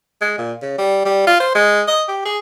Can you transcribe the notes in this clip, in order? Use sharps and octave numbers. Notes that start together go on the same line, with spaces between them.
G#3
A#2
C#3
G3
G3
F4
C5
G#3
D#5
G4
G#4